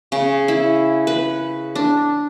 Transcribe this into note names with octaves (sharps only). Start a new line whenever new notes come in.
C#3
E4
B4
D4